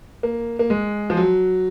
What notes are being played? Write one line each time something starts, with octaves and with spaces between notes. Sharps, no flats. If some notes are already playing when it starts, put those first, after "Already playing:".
A#3
A#3
G#3
F3
F#3